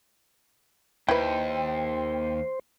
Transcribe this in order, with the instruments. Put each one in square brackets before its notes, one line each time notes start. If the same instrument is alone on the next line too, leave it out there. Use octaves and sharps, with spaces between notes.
[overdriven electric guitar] D#2 [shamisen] E4 B4 [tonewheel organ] C5 [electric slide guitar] G5